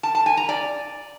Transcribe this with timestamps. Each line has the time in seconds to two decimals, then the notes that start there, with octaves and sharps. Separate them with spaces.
0.03 A5
0.15 A5
0.26 G#5
0.37 A#5
0.49 D5